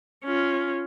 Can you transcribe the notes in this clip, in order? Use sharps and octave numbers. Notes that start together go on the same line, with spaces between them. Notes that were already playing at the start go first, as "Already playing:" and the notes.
C#4 F4